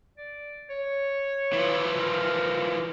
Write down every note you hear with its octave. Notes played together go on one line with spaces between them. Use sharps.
D5
C#5
E3 F3
A#4